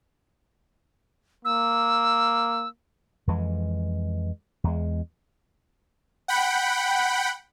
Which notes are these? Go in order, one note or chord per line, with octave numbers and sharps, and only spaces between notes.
A#3 E6
F2 E3 G#3
E2 G#3
F#5 G5 B5